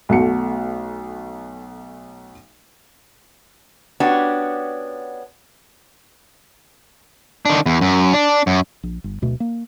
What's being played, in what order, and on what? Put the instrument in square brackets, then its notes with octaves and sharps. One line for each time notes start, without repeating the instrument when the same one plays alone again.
[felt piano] B1 A3 F#4 C#7
[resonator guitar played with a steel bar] B3 C#4 D4 F#4 G4
[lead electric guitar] D#3 D4
E2
F#2
D4
F#2
[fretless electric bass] A#1
G1
D1 B2 A3
A#3